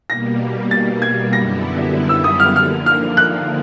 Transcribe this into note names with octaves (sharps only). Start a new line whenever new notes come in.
B2 G3 A#3 A#6
A6
G#6
F#2 D3 G3 B3 E4 A#6
E6
D#6
F6
D3 F3 A#3 F6
F6
F#6